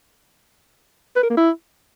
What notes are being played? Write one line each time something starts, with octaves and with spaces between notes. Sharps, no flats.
B4
A#4
A#3
E4